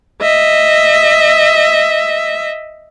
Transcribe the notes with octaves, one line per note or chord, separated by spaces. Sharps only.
D#5 E5